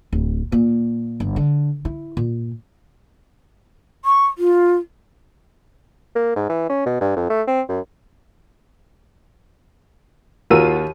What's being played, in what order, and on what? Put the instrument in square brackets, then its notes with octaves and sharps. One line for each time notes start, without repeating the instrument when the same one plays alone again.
[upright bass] D1
A#2
G1
D3
E4
A#2
[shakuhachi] C#6
F4
[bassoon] A#3
G#2
E3
C#4
B2
G2
F2
A3
C4
F#2
[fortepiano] D#2 A#4 E6 [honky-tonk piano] F4 F#4 D#7